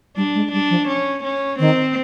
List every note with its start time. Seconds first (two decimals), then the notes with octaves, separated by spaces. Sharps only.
0.17 G3 D4
0.35 G#3
0.52 G3 D4
0.70 F3
0.88 C#4
1.24 C#4
1.59 D#3 C4